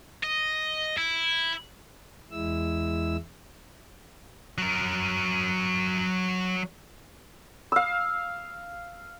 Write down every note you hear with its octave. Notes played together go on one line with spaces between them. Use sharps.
D#5
E4
E2 G#3 E4 E6
F#3 A#4
F5 E6